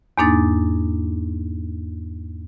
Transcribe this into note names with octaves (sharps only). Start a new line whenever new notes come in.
E2 G#2 A#3 D4 D#4 A6